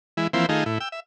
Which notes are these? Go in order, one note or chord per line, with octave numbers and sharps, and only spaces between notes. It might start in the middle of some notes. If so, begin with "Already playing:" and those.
E3 G#3 E4
E3 F3 A#3 C4 E4 C5
D#3 A3 D#4 F4 G#4
A2 E4
G5 E6
E5